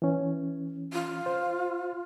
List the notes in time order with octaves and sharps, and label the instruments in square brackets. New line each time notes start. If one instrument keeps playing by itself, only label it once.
[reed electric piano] E3 C#4
[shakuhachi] F4
[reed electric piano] C5